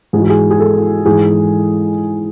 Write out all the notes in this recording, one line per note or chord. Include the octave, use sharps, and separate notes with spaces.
G#2 E3 G#4
F#4
G#4
G#4
A4
G#2 E3 G#4